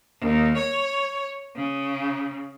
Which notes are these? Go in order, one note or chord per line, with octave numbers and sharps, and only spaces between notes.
D#2
C#5
C#3